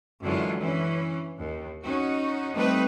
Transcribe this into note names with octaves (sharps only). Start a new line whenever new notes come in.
F#2 D3 E3 F#3 G#3 F4
E3 C#4
D#2
C#4 D#4 F#4
G3 A3 C4 D#4 B4